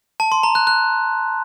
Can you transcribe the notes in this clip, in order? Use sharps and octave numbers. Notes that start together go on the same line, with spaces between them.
A5
C6
A#5
F#6
F#6